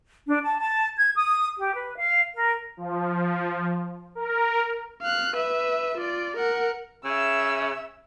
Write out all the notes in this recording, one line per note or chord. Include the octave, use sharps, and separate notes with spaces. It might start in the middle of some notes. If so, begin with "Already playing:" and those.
D4
A5
A5
G#6
D#6
G4
B4
F5
A#4
F3
A#4
F5 F#6
B4 E5
F4 D5
A#4 F#5
C#3 E5 E6